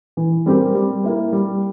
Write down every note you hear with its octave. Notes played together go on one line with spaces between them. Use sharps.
E3
G3 C4 G4 A#4
G3
A#3 E4 A#4
G3